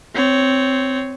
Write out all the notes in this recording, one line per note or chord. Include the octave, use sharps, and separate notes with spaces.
C4 C#5